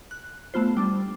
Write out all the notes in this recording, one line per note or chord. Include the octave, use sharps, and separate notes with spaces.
F#6
A3 B3 F4 C5
G3 D4